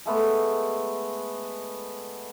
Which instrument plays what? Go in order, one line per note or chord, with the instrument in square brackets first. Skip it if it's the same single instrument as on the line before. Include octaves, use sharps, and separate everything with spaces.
[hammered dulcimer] G#3 A3 B3